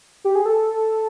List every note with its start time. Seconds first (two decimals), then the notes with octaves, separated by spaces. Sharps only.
0.24 G4
0.35 G#4
0.46 A4